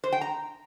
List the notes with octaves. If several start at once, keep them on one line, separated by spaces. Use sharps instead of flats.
C5
G5
A#5